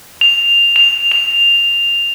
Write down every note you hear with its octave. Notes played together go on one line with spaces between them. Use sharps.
F7
F7
F7